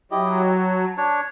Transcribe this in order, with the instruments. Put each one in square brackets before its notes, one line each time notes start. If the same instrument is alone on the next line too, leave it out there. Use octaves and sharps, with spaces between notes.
[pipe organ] F#3 [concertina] E4 G4 D#5
[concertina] A5
[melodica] D4 C#5